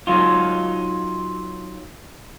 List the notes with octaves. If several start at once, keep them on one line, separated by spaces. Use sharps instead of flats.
F#3 D#4 F4